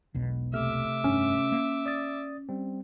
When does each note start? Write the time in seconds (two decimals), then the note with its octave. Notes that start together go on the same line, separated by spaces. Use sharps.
0.14 E1 B1 B2
0.54 C3 A3 E5 D6 F6
1.04 F1 G2 C#4 D4
1.52 A#3
1.86 D5 D#6 A6
2.49 G3 C4